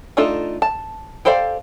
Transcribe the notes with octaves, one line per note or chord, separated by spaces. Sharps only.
A3 D4 D#4 F4 A4
A5
G4 A4 C5 D5 F5